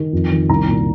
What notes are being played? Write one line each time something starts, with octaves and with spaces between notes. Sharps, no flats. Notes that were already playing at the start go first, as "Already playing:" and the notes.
Already playing: D#3
F2
D#3
C2 A#5
A#2